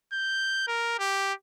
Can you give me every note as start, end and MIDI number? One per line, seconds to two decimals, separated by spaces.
0.13 0.65 91
0.67 0.96 70
0.99 1.33 67